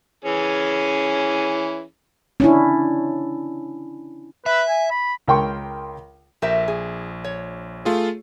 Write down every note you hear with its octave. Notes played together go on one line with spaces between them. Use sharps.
E3 C#4 G#4
C#4 D4 E4
B4 E5
G#5
B5
C#2 A#4 G5 C6 C#6
A#1 G4 A#4 E5
G#4
C#5
A3 F4 G#4